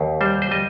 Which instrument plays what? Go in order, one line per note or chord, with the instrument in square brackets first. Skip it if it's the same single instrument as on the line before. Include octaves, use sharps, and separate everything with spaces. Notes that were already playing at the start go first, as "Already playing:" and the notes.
Already playing: [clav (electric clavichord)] D#2
G3 C5
C5
G3 D#5